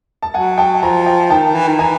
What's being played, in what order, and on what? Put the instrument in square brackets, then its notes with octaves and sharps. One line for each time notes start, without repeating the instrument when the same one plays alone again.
[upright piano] A5
[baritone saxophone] F#3 [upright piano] F#5 G#5
[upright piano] G5 A5
[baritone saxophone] F3 [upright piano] G#5 A#5
[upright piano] G5 A5
[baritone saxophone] D#3 [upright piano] G5 A5
[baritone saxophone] E3
D#3
[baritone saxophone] E3 [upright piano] G#5 A#5